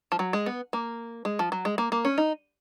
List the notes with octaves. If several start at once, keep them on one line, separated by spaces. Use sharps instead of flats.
F3
F#3
G#3
B3
A#3
G#3
F3
F#3
G#3
A#3
A#3
C#4
D#4